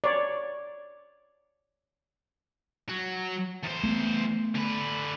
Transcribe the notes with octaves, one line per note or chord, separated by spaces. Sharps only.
C#5 D5
F#3 F#4
E2 C5
A3 B3
D3 B4